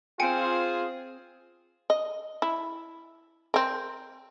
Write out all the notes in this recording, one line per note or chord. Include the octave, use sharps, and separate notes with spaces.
C4 F4 G#4 C5 G5 G#5 C#7
D#5
E4
C4 A#4